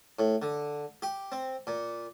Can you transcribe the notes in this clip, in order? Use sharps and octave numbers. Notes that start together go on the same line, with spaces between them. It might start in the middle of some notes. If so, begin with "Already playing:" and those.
A2
D3
G4
C4
A#2